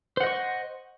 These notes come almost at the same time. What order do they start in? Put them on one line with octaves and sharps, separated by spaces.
C5 F#5 D#5 C#6